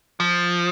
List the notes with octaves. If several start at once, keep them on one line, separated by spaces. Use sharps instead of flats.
F3